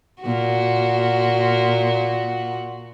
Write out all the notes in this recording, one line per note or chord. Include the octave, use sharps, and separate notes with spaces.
A#2 F#4